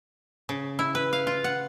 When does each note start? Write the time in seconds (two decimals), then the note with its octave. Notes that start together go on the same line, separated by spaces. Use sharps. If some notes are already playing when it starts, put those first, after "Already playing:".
0.49 C#3
0.79 E4
0.95 B4
1.13 F5
1.27 F4
1.44 F#5